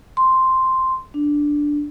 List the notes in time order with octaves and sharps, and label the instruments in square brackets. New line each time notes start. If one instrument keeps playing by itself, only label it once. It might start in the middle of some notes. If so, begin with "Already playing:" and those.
[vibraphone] C6
D4